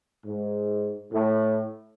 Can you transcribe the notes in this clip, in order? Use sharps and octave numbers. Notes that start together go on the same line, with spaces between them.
G#2
A2